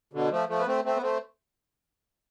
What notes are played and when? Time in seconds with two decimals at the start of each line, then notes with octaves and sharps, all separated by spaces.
0.13 B2 D3
0.31 F3 A3
0.49 F3 A3
0.59 B3
0.66 A3 C4
0.84 A3 C4
0.96 B3
1.02 A3 C4